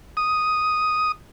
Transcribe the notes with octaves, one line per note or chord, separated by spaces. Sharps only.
D#6